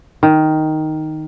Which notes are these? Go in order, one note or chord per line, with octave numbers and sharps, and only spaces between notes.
D#3